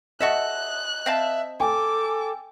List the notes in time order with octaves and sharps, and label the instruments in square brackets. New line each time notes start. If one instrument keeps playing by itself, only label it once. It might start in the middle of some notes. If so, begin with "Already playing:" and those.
[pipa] F#4 A4 E5 [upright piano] D#5 [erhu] F#6
[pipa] C4 F5 A5 [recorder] E5
[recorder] A4 [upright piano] G5 G#5 [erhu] D6